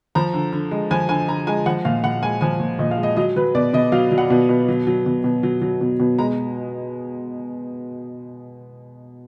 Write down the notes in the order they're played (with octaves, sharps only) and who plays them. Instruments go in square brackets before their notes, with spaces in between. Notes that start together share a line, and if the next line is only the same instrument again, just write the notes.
[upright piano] F3 A#5
D3
D3
G#3
F3 G#5
D3 G#5
D3 A#5
G#3 G#5
F3 F#5
A#2 F5
A#2 F#5
G#3 G#5
F3 G#5
A#2
A#2 D#5
F5
G#3
D#5
F#3 D#5
F#3 B4
B2 D5
B2 D#5
F#3 F5
F#3
F#5
B2
B2
F#3
F#3
B2
B2
F#3
F#3
B2
B2
G#3 A#5